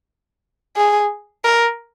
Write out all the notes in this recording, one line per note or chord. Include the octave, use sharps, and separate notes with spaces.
G#4
A#4